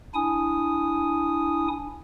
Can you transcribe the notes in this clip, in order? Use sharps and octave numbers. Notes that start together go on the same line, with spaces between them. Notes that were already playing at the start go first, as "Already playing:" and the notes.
D4 E4 G#5 D#6